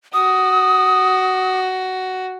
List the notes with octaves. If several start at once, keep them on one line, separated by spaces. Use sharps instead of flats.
F#4 D#6